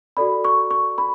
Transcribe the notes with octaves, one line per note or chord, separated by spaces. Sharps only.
F#4 A4 D5 B5
C#6
C#6
B5